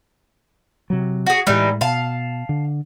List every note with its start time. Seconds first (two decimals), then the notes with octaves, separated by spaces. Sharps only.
0.90 C3 F#3
1.26 F#4 G#4
1.47 A2 E3 G3 G#3 D#4
1.81 B2 F5 A5
2.49 D3